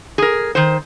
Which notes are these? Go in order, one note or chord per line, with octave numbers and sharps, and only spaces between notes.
G#4 A#4
D#3 C5